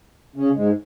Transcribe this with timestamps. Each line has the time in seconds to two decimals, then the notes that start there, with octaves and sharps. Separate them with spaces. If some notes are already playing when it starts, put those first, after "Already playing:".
0.36 C#3 C#4
0.55 G#2 G#3